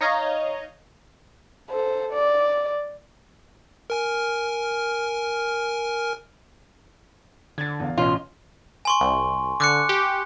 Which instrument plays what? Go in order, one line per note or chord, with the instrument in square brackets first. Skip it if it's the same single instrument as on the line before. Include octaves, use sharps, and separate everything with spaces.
[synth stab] D#4 C#5 D#5 F5 A#5
[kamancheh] A4 C5
D5
[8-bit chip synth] A#4 G#5 F6
[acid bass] D3 [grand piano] G#6 A6
[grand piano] E2 F5
[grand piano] A1 C#4 D#5 [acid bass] B2 [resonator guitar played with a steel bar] F4
[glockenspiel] G#5 C6 C#6
[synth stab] C2
[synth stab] D3 [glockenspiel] D6 F#6 C#7
[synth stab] G4